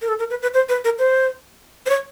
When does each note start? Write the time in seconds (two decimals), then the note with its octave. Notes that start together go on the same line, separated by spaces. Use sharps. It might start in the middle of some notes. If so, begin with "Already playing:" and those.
0.02 A#4
0.08 A4
0.19 A#4
0.30 B4
0.42 B4
0.54 C5
0.69 B4
0.85 A#4
0.99 C5
1.86 C5
1.90 C#5